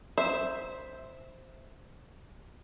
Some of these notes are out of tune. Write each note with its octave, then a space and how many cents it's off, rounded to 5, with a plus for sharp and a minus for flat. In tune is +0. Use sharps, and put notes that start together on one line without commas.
C5 +0 E5 +0